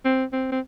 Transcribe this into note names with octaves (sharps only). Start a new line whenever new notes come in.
C4
C4
C4